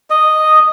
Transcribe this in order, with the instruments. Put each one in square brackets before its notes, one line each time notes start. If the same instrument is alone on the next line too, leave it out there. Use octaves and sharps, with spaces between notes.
[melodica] D#5